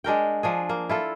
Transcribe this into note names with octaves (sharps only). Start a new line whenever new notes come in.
G#3 D4 A#4 G5
F3 D4 G#4
A#3
E4 F4 A4